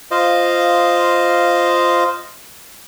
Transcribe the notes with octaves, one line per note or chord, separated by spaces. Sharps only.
F4 C5 D#5 F5